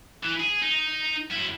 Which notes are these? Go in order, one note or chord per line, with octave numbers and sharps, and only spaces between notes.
E3
G#4
D#4
F#2 E4